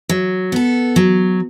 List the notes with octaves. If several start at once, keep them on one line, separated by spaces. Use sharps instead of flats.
F#3
B3 A4
F#3